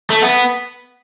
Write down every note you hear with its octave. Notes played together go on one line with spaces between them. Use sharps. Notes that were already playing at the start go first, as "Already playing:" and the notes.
A3
B3